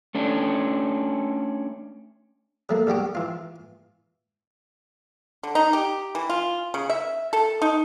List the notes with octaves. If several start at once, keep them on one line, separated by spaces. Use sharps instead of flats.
A3 C#4 D4
F#3 A3 A#3
B1 G3 F#4 G4
E3 F4
D3
D#4
G4
E3
F4
C#3
E5
A4
D#4